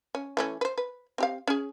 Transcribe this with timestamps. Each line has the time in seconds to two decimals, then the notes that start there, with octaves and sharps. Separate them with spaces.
0.15 C#4
0.37 E3 A3 C#4
0.61 B4 C5
0.78 B4
1.18 C4 G4 F5
1.47 C#4 G#4